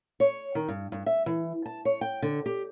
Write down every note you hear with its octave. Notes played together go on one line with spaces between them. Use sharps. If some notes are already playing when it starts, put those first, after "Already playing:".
C#5
D#3
G2
G2
E5
E3
A5
C#5
G5
D3
G4